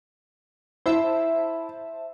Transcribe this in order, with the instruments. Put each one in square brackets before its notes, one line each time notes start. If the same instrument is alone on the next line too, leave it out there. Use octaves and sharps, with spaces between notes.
[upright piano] E4 [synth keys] C5 E5 A5